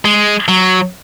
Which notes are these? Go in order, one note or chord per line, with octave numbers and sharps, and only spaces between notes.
G#3
F#3